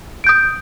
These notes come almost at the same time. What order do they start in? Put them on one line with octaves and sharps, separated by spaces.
D7 G6 D#6